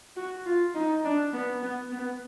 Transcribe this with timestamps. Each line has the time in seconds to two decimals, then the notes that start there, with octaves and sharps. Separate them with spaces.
0.16 F#4
0.46 F4
0.74 D#4
1.04 D4
1.33 B3
1.63 B3
1.92 B3